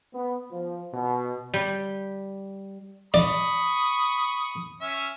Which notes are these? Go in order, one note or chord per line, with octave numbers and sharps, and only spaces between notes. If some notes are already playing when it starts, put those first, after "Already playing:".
B3
F3
B2
G3
D5 B5 C#6 D#6
C#4 E5